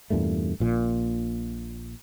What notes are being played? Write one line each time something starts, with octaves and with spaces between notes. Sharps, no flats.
E2 G2 A#2 A3
A#1 A#2